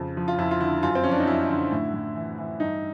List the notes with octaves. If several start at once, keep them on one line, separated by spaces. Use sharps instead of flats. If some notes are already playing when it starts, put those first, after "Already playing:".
Already playing: F2 C#3
F3
F4
F2 E4
F4
D3 E4
F#2 F4
C4
F3 C#4
D4
D#4
F#2 E4
D3
A2
A2
E3
E3
G2 D#4